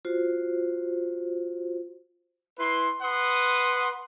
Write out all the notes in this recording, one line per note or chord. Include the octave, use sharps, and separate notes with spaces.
F4 F#4 C5
E4 B4 C6
B4 F#5 C6 D#6